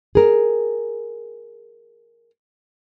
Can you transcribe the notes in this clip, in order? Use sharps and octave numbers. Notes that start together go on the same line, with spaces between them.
G#4 A#4